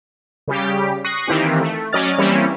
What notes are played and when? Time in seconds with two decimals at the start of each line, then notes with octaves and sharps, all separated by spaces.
0.48 C#3 G3 G4
1.04 C#6 D#6 F#6 A#6 C7
1.27 D#3 E3 A#3 C4 G4
1.60 A3
1.93 F#3 C#4 D5 D#5 F6 A6
2.18 E3 G3 A#3 C4 C#4 E4